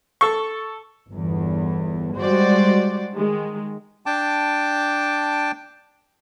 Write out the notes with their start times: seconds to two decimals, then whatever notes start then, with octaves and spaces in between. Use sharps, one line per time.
0.21 A4 C#6
1.09 G1 E2
2.18 G3 G#3 F#4 C5 D5
3.14 D#3 G#3
4.06 D4 G5 A5 D6